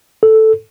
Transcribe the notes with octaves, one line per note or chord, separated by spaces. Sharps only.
A4